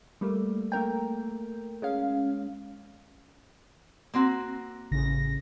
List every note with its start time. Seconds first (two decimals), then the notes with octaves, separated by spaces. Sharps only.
0.21 G3 A3 A#3
0.72 A3 A#3 A#4 G5
1.82 G#3 C#4 F5
4.14 A#3 C4 F#4
4.91 A1 C#3 A#6